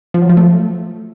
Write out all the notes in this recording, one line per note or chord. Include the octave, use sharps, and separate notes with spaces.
F3
F#3
F3
A3